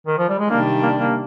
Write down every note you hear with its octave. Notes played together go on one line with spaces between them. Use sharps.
D#3
F3
G3
G#3
C3 D#3 G3 A#3 D4
A#3
A#3